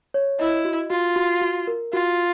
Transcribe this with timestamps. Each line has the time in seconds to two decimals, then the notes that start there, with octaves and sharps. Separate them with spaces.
0.14 C#5
0.39 E4 D#5
0.65 F#4
0.90 F4 F#4
1.16 F#4
1.42 F#4
1.67 A#4
1.93 F4 F#4